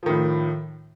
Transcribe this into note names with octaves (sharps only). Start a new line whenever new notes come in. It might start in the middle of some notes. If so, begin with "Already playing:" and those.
A2 D#3 F3